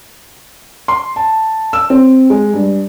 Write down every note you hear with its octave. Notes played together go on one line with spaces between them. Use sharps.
C6
A5
E6
C4
G#3
G2